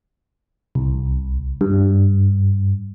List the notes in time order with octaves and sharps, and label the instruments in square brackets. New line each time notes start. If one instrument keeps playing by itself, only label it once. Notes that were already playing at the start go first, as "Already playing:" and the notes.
[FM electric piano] C2
G2